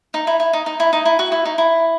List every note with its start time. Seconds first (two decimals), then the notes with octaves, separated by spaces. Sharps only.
0.14 D#4
0.27 E4
0.40 E4
0.53 D#4
0.66 D#4
0.80 E4
0.93 D#4
1.05 E4
1.19 F#4
1.32 E4
1.45 D#4
1.58 E4